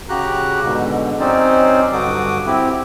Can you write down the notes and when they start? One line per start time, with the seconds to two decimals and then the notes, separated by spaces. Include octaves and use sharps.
0.09 C#3 F#4 G4 A#5 F#6
0.64 G#2 B2 D3
1.20 F#3 C4 C#4 D#4 C5 D5
1.93 G2 D3 F#4 D6 D#6
2.47 C4 E4 G4